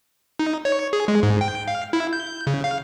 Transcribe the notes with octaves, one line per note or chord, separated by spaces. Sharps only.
D#4
C#5
G#4
G#3
G#2
G5
F5
E4
G6
C#3
F5